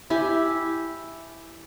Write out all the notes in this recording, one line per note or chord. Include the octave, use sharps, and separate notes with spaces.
E4 G4 G#5